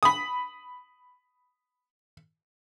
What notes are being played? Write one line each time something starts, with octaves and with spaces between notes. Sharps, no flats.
B5 D#6